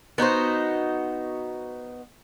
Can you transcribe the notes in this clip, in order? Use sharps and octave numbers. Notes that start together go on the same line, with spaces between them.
B3 D#4 F#4 C5